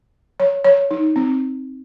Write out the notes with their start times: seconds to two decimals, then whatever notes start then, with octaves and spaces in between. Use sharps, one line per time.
0.40 C#5
0.65 C#5
0.91 D#4
1.16 C4